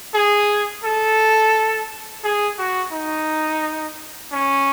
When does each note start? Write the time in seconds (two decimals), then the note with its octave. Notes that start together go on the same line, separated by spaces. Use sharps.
0.14 G#4
0.83 A4
2.24 G#4
2.59 F#4
2.92 D#4
4.32 C#4